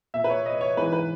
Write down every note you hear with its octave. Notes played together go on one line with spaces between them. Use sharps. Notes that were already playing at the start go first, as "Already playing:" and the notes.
A#2 E5
B4
C#5
D#5
C#5
G#2 E3 B4
B4